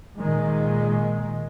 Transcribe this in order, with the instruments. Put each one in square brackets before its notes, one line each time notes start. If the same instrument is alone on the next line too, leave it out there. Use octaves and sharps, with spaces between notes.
[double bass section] A#2 D#3 G#3